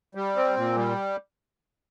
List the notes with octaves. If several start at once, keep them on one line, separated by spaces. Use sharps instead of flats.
G3
C4
A#2
G3